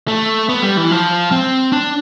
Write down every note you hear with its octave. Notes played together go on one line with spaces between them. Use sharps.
A3
B3
G3
E3
F3
C4
D4